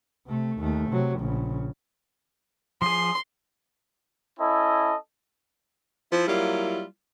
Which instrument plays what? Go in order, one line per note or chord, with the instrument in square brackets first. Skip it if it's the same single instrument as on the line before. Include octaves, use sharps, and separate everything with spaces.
[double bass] C3 A3
D#2 A3
C3 F#3
A#1 C#3
[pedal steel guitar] F3 G#4 [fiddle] C6
[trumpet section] C#4 E4 A4 D#5
[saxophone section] F3 E4
F#3 G3 A#3 E4 F4